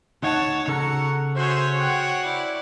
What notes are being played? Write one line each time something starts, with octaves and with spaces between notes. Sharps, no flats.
D2 D#4 C#5 F#5 A5
C#3 F#4 A4 F#5 A#5 C#7
F#4 G#4 C5 C#5 E5
C5 F#5 G5
E4 D5